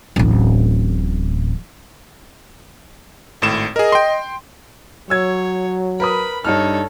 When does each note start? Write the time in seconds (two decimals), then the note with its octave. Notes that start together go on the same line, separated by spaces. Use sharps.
0.16 D1 A1
3.42 G#1 A2 E7
3.76 G#4 A#4 D#5
3.92 G5 C6
5.10 F#3 C#5 E6 G#6
6.00 A#4 B4 B5 D#6
6.45 G2 D4 D#4 A4 C#5 F6